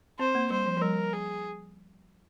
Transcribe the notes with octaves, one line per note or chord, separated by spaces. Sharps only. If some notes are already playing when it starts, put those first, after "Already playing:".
C4 C5
A#3
G3 C5
F3
F3
G3 A#4
G#4